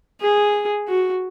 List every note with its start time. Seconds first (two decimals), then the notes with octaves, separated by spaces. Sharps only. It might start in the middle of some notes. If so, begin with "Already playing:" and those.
0.21 G#4
0.88 F#4